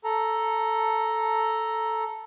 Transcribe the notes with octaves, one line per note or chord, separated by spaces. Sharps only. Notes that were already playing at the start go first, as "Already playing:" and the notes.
A4 A#5